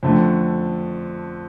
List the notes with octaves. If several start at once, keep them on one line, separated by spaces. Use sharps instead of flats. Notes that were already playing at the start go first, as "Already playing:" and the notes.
F2 D3 A3